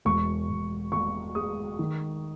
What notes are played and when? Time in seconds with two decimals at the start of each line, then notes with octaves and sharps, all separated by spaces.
0.05 E1 C#6
0.49 E1
0.92 E1 C#6
1.35 G#3 D#6
1.79 D#3